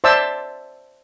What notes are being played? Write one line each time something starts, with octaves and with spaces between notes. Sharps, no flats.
C5 D5 E5 A5 E6